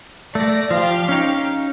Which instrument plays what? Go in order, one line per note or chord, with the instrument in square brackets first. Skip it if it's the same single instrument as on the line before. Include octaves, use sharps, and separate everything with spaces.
[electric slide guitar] A3 [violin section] D5 A#6
[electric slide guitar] F3 [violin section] G4 F5 F6
[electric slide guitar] C#4 D#4